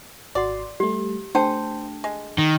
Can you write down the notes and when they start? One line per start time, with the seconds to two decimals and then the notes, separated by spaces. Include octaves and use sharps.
0.35 G#1 F#4 D5 C6
0.80 G3 A3 G4
1.35 A3 D4 C5 G5 A5
2.04 G#3
2.38 D#3 A#6